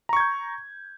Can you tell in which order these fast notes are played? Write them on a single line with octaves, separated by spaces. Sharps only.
A#5 C#6 G#6 G6